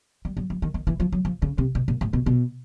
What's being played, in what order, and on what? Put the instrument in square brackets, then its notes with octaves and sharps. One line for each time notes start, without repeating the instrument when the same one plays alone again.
[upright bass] G3
F#3
F3
D#3
D#3
E3
F3
F#3
F3
C#3
C3
B2
A#2
A2
B2
B2